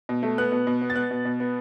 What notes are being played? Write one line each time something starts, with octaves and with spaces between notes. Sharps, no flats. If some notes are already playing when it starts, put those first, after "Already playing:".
B2
A3
B3 F#6
B2
B2
B3
A6
B3 F#6
B2
B2
B3